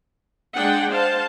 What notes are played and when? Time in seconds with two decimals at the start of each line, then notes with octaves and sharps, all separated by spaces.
0.55 G#3 D4 F#5 G5
0.93 C5 F5 A5